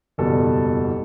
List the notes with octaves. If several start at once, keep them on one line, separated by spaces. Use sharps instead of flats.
F#1 E2 B2 G3 A4